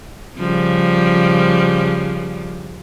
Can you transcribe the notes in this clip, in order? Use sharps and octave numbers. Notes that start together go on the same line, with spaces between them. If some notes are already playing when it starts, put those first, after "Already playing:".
C#3 F3 G3